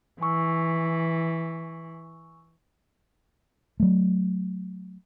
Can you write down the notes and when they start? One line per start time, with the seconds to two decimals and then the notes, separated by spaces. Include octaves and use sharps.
0.21 E3 G#5 C#6 E6
3.80 F#3 A3